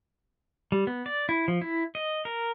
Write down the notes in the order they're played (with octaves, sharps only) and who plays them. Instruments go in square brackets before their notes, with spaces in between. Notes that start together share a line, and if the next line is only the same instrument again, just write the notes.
[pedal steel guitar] G3
B3
D5
E4
F3
E4
D#5
A#4